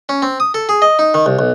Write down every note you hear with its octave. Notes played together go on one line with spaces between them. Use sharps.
C#4
C4
D#6
A4
G#4
D#5
D#4
D#3
C2
B1